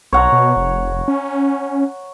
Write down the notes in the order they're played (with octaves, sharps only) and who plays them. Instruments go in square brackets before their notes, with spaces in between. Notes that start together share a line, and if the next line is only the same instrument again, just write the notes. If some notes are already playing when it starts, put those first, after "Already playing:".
[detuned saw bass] B1 [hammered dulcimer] C#5 F#5 A#5
[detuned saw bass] B2
F1
C#4